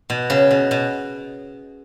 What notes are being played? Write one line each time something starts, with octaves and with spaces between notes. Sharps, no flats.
B2
C#3
B2
B2